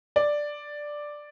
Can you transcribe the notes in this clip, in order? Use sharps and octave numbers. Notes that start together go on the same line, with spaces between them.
D5